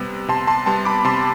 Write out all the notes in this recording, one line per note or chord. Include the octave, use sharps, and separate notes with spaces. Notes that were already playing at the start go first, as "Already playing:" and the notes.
Already playing: C3 G3 B3
C3 A5 C6
A5 C6
G3 B3 A5 C6
B5 D6
C3 A5 C6